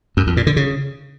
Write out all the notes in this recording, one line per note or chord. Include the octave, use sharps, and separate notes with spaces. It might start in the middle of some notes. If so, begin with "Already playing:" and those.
F#2
F2
A#2
D3
C#3